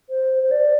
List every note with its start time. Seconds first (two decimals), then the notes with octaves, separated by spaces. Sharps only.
0.10 C5
0.43 C5
0.51 D5